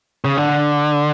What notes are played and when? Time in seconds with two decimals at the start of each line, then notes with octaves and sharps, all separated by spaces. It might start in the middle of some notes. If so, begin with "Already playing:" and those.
0.25 C#3
0.37 D3